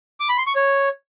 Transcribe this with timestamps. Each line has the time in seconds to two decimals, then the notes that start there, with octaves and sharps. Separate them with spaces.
0.20 D6
0.29 B5
0.38 C6
0.47 C#6
0.55 C#5